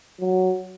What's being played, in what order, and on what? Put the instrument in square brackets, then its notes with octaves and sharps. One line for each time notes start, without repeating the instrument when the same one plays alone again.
[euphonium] F#3